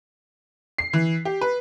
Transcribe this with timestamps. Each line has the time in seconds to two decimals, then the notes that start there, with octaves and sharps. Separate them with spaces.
0.78 C7
0.93 E3
1.25 G4
1.41 B4